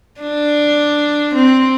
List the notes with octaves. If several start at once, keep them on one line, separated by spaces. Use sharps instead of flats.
D4
C4